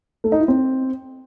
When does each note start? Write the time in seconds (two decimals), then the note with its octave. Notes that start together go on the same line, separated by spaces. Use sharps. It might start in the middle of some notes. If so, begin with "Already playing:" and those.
0.24 A3
0.32 D#4
0.40 E4
0.48 C4